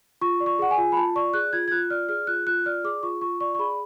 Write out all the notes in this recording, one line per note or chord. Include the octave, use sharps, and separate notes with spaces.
F4 C#6
D5
C#6
G#4 F#5
G#5
F4
B5
F4 A5
D5 C#6
G#4 F#6
F4 G#6
G#6
F4 F#6
D5 F6
G#4 F6
F4 F#6
F4 F#6
D5 F6
G#4 D6
F4 C#6
F4 C#6
D5 C#6
C#6
G#4 B5